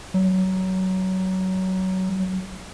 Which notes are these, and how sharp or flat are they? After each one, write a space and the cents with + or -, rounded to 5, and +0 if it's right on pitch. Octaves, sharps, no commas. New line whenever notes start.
F#3 +20